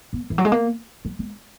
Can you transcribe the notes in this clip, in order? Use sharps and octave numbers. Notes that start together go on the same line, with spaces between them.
B3
D#3
E3
F#3
G#3
A#3
F#3
G#3